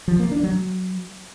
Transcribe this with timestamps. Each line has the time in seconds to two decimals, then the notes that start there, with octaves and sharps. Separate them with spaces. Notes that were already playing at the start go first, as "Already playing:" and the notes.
0.08 F3
0.20 A#3
0.31 D4
0.43 F#3